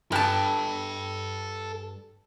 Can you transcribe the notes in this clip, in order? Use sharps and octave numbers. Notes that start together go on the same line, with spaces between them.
G2 A4 G5 A5